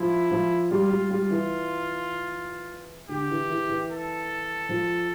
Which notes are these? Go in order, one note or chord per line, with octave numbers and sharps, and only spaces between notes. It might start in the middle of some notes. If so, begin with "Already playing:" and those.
Already playing: F3 E4
F3
G3 F4
G3
G3 F4
E3
D3 G4
E3
E3
E3
A4
F3